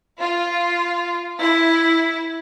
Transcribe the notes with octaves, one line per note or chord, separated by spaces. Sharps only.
F4
E4